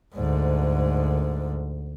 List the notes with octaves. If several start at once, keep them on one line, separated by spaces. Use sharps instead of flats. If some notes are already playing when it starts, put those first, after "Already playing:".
D2 G#2